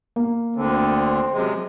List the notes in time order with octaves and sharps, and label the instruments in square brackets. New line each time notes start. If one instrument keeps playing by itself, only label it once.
[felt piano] A#3
[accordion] D2 D3 [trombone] C4
[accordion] F#2 C3 G#3